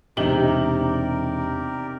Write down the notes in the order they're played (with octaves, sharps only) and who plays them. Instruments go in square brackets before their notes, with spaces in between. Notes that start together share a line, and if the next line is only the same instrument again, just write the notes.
[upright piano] E1 F#7 [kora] C3 [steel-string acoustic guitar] D#4 [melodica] G4 A#4 D5